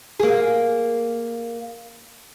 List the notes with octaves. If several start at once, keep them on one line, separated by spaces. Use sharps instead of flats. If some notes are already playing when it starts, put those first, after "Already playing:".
A#3 G#4